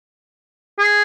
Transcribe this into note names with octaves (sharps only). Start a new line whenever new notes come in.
G#4